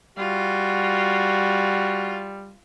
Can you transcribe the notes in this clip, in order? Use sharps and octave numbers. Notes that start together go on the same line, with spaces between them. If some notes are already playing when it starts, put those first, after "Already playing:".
G3 F4 F#4